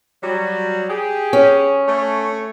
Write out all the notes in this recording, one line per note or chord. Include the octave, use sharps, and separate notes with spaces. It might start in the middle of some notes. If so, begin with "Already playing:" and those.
F#3 G3
G4 G#4
C#4
A3 C#5